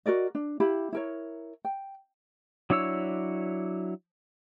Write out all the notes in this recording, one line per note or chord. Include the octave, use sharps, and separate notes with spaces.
F#4 A#4 D5 D#5
D4
E4 G4 F5 B5
E4 A#4 C#5
G5
F#3 D4 E4 C#5 E6